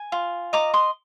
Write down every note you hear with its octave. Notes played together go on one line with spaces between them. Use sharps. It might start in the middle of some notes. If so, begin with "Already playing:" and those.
Already playing: G#5
F4
D#5 A#5 D6
C6 D#6